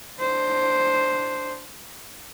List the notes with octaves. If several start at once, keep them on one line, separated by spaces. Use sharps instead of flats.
D4 C5